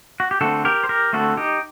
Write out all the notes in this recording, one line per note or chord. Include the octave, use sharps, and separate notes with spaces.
F#4
G4
D3 A3 C4 F#4 A4
G4 A#4
C5
G4 A#4
D3 A3 C4 F#4 A4
D#4 G4